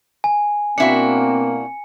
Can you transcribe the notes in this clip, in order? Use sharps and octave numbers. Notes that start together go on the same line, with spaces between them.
G#5
B2 A#3 C4 D4 E4 F#4 C#7